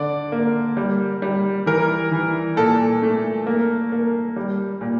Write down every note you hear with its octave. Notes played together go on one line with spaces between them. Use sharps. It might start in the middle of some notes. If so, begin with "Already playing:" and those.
Already playing: D3 D5
A#3
G3
G3
E3 A#4
E3
A#2 A4
A3
A#3
A#3
G3
A#2